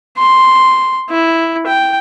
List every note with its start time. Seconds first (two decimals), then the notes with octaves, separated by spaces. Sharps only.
0.18 C6
1.10 E4
1.67 G5